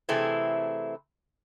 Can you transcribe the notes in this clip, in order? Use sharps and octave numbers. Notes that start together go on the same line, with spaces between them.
C3 E3 A3 C4 E4 G#4